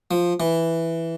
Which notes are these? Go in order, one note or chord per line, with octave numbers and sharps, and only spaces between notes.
F3
E3